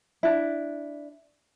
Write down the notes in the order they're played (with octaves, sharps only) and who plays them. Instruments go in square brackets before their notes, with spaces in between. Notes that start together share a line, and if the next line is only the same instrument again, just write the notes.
[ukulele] D4 E4